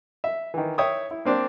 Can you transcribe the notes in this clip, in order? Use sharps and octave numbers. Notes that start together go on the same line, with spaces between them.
E5
D#3 E3
C#5 E5 G5 D#6
E4
A#3 C4 D4